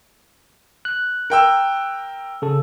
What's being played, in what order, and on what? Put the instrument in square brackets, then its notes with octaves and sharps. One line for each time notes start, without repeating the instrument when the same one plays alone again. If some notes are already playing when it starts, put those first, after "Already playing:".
[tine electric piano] F#6
[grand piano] A#4 G5 E6
[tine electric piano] C#3 A4